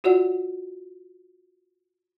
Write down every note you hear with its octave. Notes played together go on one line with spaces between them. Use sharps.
F4 F#4 C#5 D5 F#5